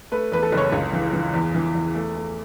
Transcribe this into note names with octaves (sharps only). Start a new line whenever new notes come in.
A3 B4
E2 B4
A4
F#1 C#5
C#2
E3
E3
E2
E3
E2
A3
A3